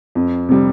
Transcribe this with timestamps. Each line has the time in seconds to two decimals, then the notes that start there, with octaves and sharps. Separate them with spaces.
0.15 F2
0.49 C3 G3